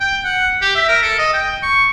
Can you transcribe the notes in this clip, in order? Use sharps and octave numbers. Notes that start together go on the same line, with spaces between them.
G5
F#5
G4
E5
A#4
A4
D#5
G5
C#6